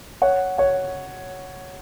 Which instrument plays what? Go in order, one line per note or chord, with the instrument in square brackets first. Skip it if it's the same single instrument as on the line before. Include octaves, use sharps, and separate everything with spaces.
[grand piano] C#5 F#5
C#5 F#5